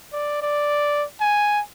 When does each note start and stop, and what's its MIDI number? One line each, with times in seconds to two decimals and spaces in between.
0.13 0.39 74
0.42 1.05 74
1.21 1.61 80